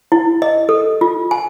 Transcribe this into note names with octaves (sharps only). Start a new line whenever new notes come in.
E4
D#5
A4
F4
G#5